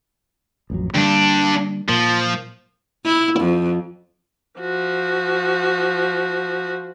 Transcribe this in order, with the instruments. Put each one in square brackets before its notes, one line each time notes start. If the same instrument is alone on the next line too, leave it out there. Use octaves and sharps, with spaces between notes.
[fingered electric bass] A1 F2 F#3
[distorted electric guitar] G2 D4 [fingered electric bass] D3 G3 A#3
[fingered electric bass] A#2 A#3 [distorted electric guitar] F3
[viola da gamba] E4
F2
[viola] F3 F#4